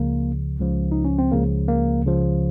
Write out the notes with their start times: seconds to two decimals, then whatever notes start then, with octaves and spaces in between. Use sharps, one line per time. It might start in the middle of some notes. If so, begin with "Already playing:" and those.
Already playing: C#2 C#3 F3 A#3
0.59 C#2 C#3 F3
0.92 D#4
1.04 C#4
1.18 C4
1.32 C#2 C#3 F3 A#3
1.68 A#3
2.05 C#2 C#3 F3